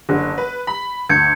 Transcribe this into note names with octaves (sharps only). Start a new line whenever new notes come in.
F#1 D3
B4
B5
D2 G6 G#6 C#7